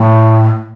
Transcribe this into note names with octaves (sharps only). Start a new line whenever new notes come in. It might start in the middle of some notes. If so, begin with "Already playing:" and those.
Already playing: A2